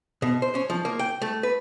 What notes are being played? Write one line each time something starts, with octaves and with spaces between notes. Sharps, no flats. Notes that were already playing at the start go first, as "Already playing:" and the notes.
B2
C5
C#4
F3
A#3
G5
A3
B4